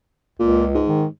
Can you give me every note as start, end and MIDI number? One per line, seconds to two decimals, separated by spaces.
0.39 0.82 37
0.39 0.65 46
0.75 1.05 44
0.87 1.06 51